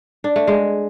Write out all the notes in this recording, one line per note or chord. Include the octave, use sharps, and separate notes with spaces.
D4
A3
G#3